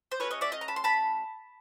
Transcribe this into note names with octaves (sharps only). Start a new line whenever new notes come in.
C5
A3 C#4 F#4 B4 C#5
C#5 D#5
D5 E5
D#5 F5
A#5
A5 B5
C6
A5 B5